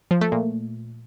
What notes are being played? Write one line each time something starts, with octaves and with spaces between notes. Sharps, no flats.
F3
A3
A#2